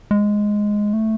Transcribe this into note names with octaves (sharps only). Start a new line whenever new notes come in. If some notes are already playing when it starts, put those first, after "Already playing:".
G#3
A3